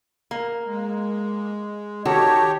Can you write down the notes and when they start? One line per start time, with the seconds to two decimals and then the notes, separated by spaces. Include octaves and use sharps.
0.31 A#3
0.65 G#3
2.05 D#3 F#4 G4 A4 C#5